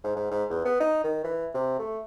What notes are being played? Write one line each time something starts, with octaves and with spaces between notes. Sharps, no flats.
G#2
G#2
G#2
E2
B3
D#4
D#3
E3
C3
A3